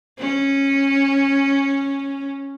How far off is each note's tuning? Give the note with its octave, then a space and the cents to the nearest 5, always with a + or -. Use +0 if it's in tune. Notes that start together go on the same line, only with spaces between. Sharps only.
C#4 -10